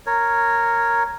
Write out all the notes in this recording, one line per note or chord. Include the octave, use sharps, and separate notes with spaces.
A#4 C#5